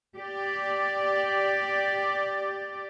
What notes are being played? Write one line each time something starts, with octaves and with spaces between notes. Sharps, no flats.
G4 D5